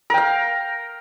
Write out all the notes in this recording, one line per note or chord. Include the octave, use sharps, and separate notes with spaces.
A#4 F5 G5